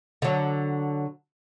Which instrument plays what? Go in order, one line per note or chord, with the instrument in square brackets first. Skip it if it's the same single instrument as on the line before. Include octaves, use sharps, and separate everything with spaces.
[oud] D3 F#3